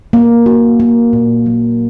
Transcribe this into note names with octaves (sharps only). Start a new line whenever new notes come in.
A#3
F#4
A#3
A#2
F#3